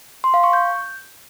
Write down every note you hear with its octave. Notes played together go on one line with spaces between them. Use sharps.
C6
F5
C#6
G6